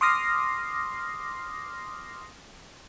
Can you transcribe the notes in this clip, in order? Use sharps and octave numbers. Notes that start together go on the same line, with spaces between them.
C6 D6 D#6 F6 A#6 C7